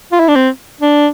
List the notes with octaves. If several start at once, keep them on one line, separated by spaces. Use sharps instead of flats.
F4
E4
D4
C4
D4